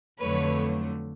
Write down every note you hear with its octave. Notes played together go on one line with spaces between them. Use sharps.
F2 D3 F#3 A3 B4 C#5